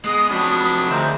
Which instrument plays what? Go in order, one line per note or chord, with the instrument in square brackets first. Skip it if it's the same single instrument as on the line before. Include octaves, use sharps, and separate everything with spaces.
[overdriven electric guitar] G#3 [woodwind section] B3 [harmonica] D#5 [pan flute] D#6
[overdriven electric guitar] C3 F3 [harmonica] F#3 D4 [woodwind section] F#4 B5
[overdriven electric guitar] D2 [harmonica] A#3 C4 E5 [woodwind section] G#4 D#5 G5